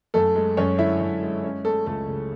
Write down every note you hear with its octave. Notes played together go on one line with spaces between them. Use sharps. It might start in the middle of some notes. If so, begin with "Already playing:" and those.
F#2 A3 A4
G#3
F#2 C#4 C#5
D3 E4 E5
F#2
G#3
C#4
G#3 A3 A4
C#2 A3 A4
C#3